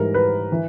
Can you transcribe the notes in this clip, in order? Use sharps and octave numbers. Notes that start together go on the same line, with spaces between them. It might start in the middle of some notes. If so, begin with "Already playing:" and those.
Already playing: G#2 E3 G3 A#4
B4
E3